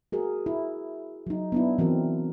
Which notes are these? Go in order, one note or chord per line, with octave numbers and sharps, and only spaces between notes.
F#4 G#4 A#4
E4
F#3 D#4
B3 D4 E4
E3 C4 F#4 A#4